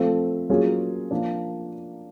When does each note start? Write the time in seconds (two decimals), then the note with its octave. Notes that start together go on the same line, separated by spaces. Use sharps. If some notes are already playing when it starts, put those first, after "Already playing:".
Already playing: F3 A3 C4
0.50 F#3 A#3 C#4 F4 G#4
1.11 F3 A#3 D4